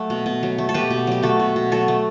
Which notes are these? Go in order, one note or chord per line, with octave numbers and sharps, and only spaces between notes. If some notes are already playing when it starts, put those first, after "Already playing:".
Already playing: F#3 A3
B2
B2
F#3
A3
A4
B2 G4 B4
B2
F#3 G4
A3 F#4 A4
B2
B2
F#3 F#4 A4
A3